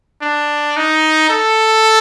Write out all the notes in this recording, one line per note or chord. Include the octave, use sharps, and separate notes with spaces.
D4
D#4
A4